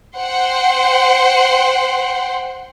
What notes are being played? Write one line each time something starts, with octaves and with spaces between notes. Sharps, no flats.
C5 F#5 G5 C6